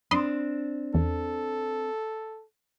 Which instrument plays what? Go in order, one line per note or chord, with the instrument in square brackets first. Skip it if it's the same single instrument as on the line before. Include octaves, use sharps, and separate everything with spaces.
[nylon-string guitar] C4 D4 [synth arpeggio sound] B5 C6 D#6
[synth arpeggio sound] E2 [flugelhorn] A4